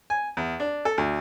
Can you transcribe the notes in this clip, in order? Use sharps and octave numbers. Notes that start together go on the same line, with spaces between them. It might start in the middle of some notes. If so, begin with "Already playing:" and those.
G#5
E2
D4
A4
D2